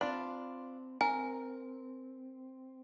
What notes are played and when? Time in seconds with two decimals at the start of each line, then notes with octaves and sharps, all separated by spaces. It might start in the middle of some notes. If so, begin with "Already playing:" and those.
0.01 C4 D4 F4 B5
1.01 C4 A#4 G#5